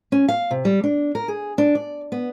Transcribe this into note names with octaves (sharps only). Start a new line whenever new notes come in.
C#4
F5
C3
G3
D4
A#4
G#4
D4
D5
B3